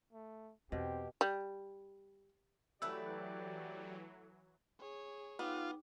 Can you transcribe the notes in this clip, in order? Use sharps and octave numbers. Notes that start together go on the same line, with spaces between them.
A3
E2 B2 C4 G4
G3
E3 F#3 A3 E4 G4 B4 D5 E6
G#4 C#5
B3 D#4 F4 G5 D6